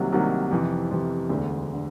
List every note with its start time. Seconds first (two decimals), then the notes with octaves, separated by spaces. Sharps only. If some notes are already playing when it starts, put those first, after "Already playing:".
Already playing: C2 C3 D#3 F#3 A#3
0.12 C2 C3 D#3 F#3 A#3
0.51 F2 C3 E3
0.91 F2 C3 E3
1.30 E1 D2 D3
1.73 D3